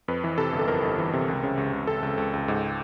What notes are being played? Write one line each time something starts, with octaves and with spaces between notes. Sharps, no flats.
F2 B4
E3
C3 A4
G1
A4
F2 A#4
G1
E3
C3
C#2
C#3
C#2
C#2
C#2 A4
C#2
C#2
C#2
G#2